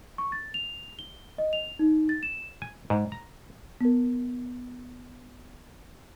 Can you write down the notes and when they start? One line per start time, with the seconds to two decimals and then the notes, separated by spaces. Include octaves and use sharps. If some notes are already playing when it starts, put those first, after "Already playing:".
0.18 C#6
0.32 A6
0.54 F7
0.99 G7
1.38 D#5
1.53 F7
1.79 D#4
2.09 A6
2.23 E7
2.62 G#5
2.90 G#2
3.12 A#5
3.81 B3 A#4